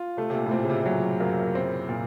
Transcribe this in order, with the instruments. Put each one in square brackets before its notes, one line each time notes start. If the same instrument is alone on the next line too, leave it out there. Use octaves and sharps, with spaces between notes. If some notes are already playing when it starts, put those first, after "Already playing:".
Already playing: [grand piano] F4
[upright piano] C3 [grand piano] A3
[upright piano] C3
A#2
A2
[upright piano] A#2 [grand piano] C4
[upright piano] C#3
C3
C3
[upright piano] A#2 [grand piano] F#3
[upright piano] F#2 [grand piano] A#3
[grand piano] C4
A#2